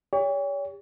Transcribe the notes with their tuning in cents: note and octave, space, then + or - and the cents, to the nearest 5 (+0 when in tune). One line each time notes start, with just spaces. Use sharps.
G4 +40 C#5 +35